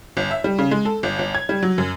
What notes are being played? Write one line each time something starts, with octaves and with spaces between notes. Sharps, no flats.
G1
E5
G3
C#3
G#3
A4
G1
G1
G#6
G3
F#3
F#2